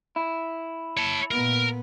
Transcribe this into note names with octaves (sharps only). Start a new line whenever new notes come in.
E4
C#5 A5
A#2 B3 A#4